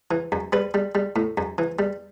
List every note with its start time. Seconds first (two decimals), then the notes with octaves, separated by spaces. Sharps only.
0.11 E3
0.32 F#2
0.53 G3 B4
0.74 G3
0.95 G3
1.16 A2
1.37 F#2
1.58 E3
1.79 G3